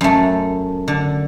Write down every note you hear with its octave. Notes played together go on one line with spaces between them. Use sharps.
F#2 A3
D3